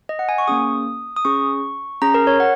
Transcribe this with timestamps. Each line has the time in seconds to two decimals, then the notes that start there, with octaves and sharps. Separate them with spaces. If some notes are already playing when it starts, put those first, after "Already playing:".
0.09 D#5
0.19 F#5
0.29 G#5
0.38 C#6
0.48 A#3 C#4 G#4 D#6
1.16 D#6
1.25 C#4 G#4 C#6
2.02 C#4 G#4 A#5
2.14 A#4
2.27 C#5
2.40 F#5